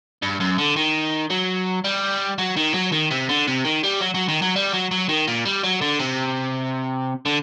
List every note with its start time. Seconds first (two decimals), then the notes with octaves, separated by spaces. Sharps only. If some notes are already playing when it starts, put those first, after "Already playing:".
0.22 G2
0.40 F#2
0.58 D3
0.76 D#3
1.31 F#3
1.84 G3
2.38 F#3
2.57 D#3
2.74 F#3
2.92 D#3
3.11 C3
3.29 D3
3.47 C3
3.64 D#3
3.83 G3
4.01 F#3
4.14 F#3
4.28 D#3
4.42 F#3
4.56 G3
4.73 F#3
4.91 F#3
5.09 D#3
5.28 A#2
5.45 G3
5.63 F#3
5.82 D3
6.00 C3
7.25 D3